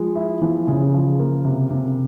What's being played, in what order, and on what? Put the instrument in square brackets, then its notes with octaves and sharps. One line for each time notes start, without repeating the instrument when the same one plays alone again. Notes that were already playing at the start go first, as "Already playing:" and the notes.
Already playing: [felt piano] F3 [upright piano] G#3
[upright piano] E4
[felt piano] E3 [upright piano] F3
[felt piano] C#3 [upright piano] G#4
[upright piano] F3
A#3
C3
C3